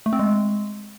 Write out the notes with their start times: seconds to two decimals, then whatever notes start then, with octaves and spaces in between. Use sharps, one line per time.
0.06 A3
0.13 C4
0.19 G#3